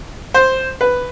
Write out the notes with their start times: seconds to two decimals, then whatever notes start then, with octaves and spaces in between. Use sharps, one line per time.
0.34 C5
0.81 B4